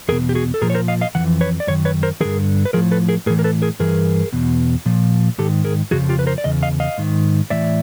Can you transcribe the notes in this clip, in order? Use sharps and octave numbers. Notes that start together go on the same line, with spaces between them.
E2 B2 G#4 A#4
G4
F#4 G#4
A4
A#2 F3 G#4 A#4
C#5
A#4 C5
D#5 F5
D#5 F5
F2 C#3 E3 F#5
B4 C#5
D5
F#2 D#3 C#5
B4 C#5
A#4 C5
G2 D3 F3 G#4 A#4
B4
A2 F3 G#4 A#4
A4 B4
G#4 A#4
A2 E3 G#4 A#4
A#4
A4 B4
G#4 A#4
G2 E3 G#4 A#4
E2 B2
A#2 F3
G#2 D#3 G4 A4
G#4 A#4
F2 C#3 F3 F#4 G#4
F4 G4
B4
A#4 C5
D5
E2 C#3 D#5
D#5 F5
D#5 F5
G#2 D#3
A2 E3 D5 E5